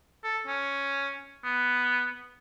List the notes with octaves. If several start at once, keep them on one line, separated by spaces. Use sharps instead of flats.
A4
C#4
B3